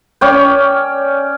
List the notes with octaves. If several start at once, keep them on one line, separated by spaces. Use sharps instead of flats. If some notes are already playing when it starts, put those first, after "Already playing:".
C#4 C#5 D5 G5